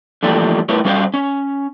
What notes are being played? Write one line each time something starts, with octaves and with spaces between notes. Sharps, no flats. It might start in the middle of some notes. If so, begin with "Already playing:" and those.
D3 E3 F3 G3 A3 A#3
A3 E4 A#4 B4 C#5
G3 C#4 F#4 C5 F5
C#4